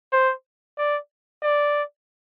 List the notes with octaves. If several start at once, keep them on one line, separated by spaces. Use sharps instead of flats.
C5
D5
D5